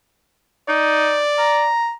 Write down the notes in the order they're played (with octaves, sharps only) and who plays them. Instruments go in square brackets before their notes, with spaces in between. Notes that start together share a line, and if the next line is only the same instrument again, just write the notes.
[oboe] D#4 [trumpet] D5
[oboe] A#5